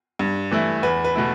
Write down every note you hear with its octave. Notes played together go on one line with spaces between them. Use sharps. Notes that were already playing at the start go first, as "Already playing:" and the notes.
G2
E3 A3 E4
E2 B4
B4
B2 A3 E4